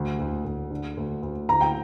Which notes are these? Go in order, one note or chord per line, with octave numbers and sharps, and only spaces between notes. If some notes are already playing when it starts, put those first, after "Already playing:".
Already playing: D2
D2
D2
D3
D2
D2
D2 A#5
G5